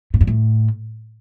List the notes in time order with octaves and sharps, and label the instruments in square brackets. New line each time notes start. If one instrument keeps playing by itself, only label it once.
[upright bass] A2
G2
A2